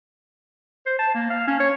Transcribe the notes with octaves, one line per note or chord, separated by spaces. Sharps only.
C5
A5
A#3
F5
C#4
C#5